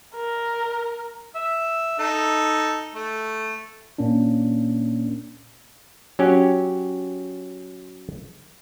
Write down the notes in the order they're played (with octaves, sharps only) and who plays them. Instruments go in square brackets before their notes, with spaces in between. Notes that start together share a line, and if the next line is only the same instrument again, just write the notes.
[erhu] A#4
[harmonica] E5
D#4 A4
A3
[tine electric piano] A#2 A#3 C#4 D4
[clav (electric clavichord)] F#3 C#4 G4